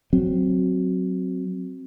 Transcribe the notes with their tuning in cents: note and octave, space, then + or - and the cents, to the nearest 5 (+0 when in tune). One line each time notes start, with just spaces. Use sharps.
F#3 +0 C4 +0